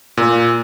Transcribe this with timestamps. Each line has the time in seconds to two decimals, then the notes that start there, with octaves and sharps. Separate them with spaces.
0.17 A#2